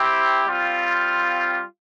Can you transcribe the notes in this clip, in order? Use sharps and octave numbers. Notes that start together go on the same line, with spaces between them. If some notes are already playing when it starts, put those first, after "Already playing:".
Already playing: C4 E4 G4
G3 C4 F4